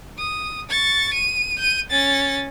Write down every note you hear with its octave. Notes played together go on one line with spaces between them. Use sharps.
D#6
C#6 A6
D#7
G6 D#7
C#4 A6